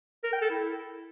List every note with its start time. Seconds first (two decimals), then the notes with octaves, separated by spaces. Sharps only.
0.24 A#4
0.33 G5
0.42 A4
0.50 E4